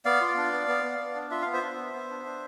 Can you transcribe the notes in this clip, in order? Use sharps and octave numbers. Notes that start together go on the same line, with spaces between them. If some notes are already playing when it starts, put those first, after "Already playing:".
B3 D5 F5
F4
D4
B3
B3
B3
B3
D4
F4 E5
F5
B3
C5 E5
D4
B3
B3
D4
D4